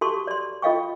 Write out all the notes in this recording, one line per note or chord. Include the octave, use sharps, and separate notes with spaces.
F#4 G4 A4 A5 C6 C#6
D5 C6
F4 A4 D#5 F5 G5 C#6